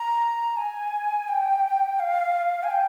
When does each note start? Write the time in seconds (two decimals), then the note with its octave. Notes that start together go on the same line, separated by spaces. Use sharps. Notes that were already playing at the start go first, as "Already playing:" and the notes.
Already playing: A#5
0.57 G#5
1.28 G5
1.99 F5
2.63 G#5
2.70 G5